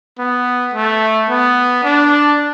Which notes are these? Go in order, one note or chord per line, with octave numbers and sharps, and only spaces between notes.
B3
A3
B3
D4